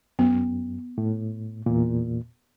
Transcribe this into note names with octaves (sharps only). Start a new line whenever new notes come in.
F#2 B3
A2
E2 A#2